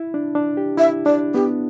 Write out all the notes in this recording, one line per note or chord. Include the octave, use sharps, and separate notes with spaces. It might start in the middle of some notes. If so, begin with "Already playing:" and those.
Already playing: E4
D4
D4
G4
E4 E5
D4 D5
B3 G4